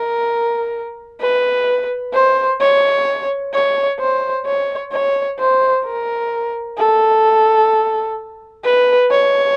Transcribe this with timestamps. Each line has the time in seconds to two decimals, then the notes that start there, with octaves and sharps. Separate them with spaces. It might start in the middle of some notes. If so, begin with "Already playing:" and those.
Already playing: A#4
1.21 B4
2.14 C5
2.61 C#5
3.54 C#5
4.00 C5
4.46 C#5
4.92 C#5
5.39 C5
5.85 A#4
6.78 A4
8.64 B4
9.11 C#5